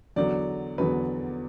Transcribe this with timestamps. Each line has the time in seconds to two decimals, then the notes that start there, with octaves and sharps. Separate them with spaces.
0.16 E2 D3 F#3 D5
0.78 E2 D3 F#3 B4